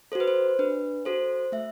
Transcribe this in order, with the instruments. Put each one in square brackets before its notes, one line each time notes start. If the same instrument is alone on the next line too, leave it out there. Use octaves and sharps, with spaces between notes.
[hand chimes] F#4 A4 C5
B4
C5
D4 B4
F#4 A4 C5
A3 E5